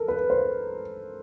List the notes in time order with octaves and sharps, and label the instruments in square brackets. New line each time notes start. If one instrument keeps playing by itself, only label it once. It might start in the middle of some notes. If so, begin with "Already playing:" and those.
Already playing: [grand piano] A4 A#4
B4
C5